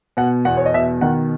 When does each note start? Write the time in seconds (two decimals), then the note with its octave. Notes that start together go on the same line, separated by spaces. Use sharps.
0.17 B2 F#5
0.45 E2 F#5
0.57 C#5
0.66 D#5
0.73 B2 E5
1.01 D#3 F#5